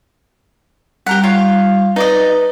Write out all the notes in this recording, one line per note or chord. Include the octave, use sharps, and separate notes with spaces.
G3 G4 A#4 F#5
F4 C#5 F5
D#4 B4 D5 D#5